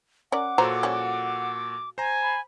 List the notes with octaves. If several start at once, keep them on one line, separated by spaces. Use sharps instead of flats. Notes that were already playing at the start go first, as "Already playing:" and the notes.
C#4 A#4 D5 F#5 D6
A#2 F#3 F#4 A4 C5 A#5
F3 G3 C#4
C5 G#5 A#5
B5